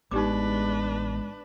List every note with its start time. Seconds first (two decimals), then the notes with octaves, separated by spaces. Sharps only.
0.11 A1 G#3 B3 D4 D#4 G4 B4 D6